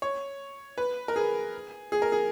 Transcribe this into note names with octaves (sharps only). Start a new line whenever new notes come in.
C#5
B4
A#4
G#4
G#4
A#4
G#4